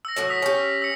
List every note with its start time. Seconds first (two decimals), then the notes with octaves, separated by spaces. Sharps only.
0.05 E6 A#6
0.16 A2 F#3 F#4
0.29 D#6 E6 B6
0.42 C#4 G4
0.82 E6 C#7